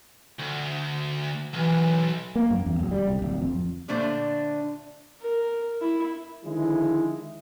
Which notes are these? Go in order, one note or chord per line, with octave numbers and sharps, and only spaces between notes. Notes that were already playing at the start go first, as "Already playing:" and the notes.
D2
B1 E3
A#3
F#2
E2
D1
G3
C2
D1
F2
A#2 D3 A3 D4 C5
A#4
E4
D3 D#3 F3 G#3 E4